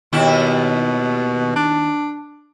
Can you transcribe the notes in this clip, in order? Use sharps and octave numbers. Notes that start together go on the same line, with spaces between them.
D#2 B2 E4
D4